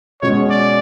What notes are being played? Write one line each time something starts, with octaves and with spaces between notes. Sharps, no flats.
B2 G#3 C#4 F#4 C#5
D5